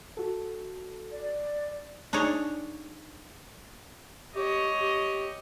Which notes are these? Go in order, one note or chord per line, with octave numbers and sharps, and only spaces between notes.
F#4 A4
D5
D4 D#4 G#4 C#5
G4 C#5 D#5
G4